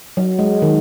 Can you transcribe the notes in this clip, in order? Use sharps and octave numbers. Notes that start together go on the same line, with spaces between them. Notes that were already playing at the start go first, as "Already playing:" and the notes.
F#3
G#3
D#3